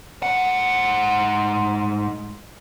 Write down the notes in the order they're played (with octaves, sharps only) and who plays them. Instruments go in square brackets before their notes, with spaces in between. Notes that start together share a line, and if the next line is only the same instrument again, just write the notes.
[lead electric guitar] G#2 F#5